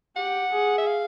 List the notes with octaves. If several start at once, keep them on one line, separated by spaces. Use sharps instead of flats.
G4 F#5
G#4
E5
F5